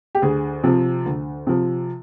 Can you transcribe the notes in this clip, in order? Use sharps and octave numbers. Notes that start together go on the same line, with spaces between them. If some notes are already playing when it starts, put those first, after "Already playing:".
G4
D2 G#4
C3 F3
D2
C3 F3